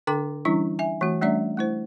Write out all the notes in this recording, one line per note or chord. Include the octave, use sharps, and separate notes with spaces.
D3 D4 A4 G5 D6
E3 G3 C#4 D4 E4
E5 G#5
E3 A3 C4 F#4
G3 A3 C#4 D4 D5 E5
A3 E4 C5